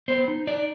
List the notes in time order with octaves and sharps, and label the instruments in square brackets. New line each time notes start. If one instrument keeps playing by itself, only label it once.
[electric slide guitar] B3 C5
D#4
D#4 D5